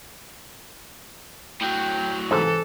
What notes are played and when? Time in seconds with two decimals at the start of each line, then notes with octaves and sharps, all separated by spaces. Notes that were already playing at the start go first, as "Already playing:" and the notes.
1.61 A2 F#3 G5
2.31 G#2 C3 E3 A4